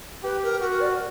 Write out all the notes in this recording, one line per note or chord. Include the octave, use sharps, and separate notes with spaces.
G4 B4
A#4
F#4 A#4
A#4
D5